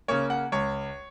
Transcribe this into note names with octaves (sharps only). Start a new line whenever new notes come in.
C#3 A#3 C#5
F#5
C#2 C#5